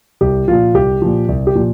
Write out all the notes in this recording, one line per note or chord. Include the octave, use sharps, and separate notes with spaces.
C2 G4
A#2 F3 F4
C2 G4
A#2 F3
C2
G4
A#2 F3